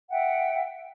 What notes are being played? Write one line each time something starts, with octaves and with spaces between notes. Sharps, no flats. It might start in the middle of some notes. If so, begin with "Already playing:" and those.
E5 F#5 G5